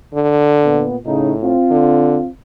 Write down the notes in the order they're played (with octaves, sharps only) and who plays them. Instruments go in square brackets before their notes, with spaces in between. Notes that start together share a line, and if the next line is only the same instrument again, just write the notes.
[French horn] D3
[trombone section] A#2 B3
[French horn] A2 [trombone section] C#3 D#4
[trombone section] C4 F4
[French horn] D3